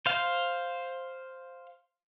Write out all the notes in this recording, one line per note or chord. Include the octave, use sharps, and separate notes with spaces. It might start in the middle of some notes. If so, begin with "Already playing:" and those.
C5 F5